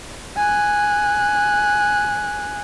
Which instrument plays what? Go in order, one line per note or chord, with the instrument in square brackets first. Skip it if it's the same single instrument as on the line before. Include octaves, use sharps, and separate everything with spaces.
[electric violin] G#5 F#6